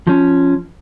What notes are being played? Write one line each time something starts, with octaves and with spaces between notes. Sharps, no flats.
F3 C#4